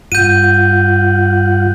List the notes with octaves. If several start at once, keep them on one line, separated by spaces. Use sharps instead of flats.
G2 F4 F#5 G6 D#7